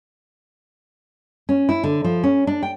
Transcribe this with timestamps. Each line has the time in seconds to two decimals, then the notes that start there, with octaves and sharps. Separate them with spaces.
1.49 C#4
1.69 E4
1.84 D3
2.04 F3
2.24 C#4
2.47 D4
2.63 G5